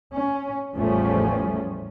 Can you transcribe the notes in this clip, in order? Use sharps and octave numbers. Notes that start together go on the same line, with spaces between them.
C#4
A1 E2 F3 G3 A3 C#4